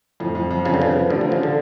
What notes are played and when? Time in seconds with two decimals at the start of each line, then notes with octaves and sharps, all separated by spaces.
0.20 F2 A2
0.35 F2
0.51 F2
0.65 F2 C#3
0.74 D3
0.80 C#3 B3
0.95 F3
1.10 A1 D3
1.21 D3
1.24 F3
1.32 C#3
1.43 D3